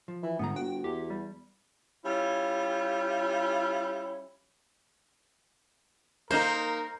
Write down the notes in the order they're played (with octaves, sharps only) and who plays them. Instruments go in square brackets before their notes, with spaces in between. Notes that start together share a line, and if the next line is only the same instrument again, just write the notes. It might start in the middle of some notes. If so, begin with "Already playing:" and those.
[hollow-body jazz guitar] F3
[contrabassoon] E3
[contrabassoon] G1 [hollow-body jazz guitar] G#2 D3 A#5 [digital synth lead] B3
[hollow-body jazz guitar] F#4 [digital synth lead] G5
[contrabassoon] E2 [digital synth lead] G4
[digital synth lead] G3
[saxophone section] G3 C#4 E4 F4
[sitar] A#3 D#4 [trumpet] A#4 [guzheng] C5 [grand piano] A#5